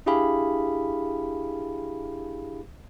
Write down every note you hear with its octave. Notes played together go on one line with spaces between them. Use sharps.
D4 E4 G4 G#4 F5 B5